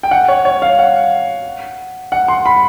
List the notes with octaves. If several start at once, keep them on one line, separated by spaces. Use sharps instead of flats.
G5
F#5
C#5
C#5
F5
F#5
F#5
C6
B5